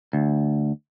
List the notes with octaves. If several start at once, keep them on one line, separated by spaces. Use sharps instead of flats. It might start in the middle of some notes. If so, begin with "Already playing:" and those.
D2